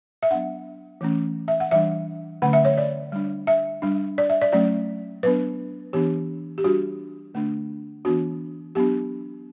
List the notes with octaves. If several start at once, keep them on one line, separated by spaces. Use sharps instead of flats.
E5
F#3 B3 D4 F#5
E3 A3 C#4
E5
F#5
E3 G3 D4 E5
D3 F#3 A3 C#4 F#5
E5
C#5
D5
G3 D4
E5
G3 D4
D5
E5
D5
F#3 A3 C#4 D5
F#3 B3 D4 B4
E3 B3 D4 G4
G4
G3 D4 F#4
D3 A3 D4
E3 B3 D4 F#4
F#3 B3 D4 G4